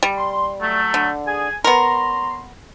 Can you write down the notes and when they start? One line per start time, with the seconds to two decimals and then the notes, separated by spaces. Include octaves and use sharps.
0.03 G3
0.17 C6
0.60 F#3 A3
0.94 D3
1.27 G#4 G#5
1.64 B3 A#4 C#5 A#5 C6